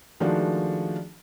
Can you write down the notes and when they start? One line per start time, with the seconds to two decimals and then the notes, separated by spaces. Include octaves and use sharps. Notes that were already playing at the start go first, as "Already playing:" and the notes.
0.20 D#3 F3 G#3 A3 D4 F#4